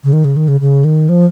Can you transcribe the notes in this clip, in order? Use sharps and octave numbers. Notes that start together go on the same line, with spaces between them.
C#3
D#3
C#3
D#3
C#3
C#3
D#3
F3